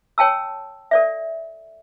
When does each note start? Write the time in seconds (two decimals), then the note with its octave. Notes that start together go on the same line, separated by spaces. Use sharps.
0.18 C#5 G5 A5 E6
0.91 A4 D5 E5